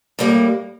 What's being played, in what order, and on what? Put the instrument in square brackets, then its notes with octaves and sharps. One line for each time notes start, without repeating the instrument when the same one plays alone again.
[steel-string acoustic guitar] A2 G3 A#3